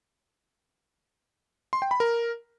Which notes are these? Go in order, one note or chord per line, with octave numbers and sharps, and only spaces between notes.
C6
G5
B5
A#4